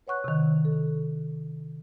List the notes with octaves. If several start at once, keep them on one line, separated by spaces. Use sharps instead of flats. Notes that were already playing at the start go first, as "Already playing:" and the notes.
B4 C#5 F#5 C#6 F#6
C3 D#3
A4